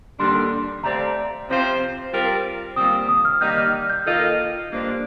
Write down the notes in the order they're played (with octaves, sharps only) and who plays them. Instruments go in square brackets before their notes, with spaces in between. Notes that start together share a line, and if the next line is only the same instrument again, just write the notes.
[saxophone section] D#2 D3 G3 D4 [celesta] C6
[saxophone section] A3 C4 G4 D5 F5 [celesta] A#5
[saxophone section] C3 F3 C4 F4 C5
G3 C4 F4 A#4
[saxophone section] A#2 G3 C4 [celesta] D#6
[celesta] D#6
F6
[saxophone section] D#3 G3 A#3 D#4 [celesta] G6
[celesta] F6
F6
G6
[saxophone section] D#3 A#3 F4 A4 D#5
G2 F3 A#3 D4